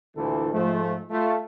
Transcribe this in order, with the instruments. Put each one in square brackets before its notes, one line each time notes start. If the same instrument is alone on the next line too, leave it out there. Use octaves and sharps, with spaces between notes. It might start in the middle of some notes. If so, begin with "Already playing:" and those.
[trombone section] D2 A#2 D3 E3 E4 A4
G#2 F3 A3
A3 F4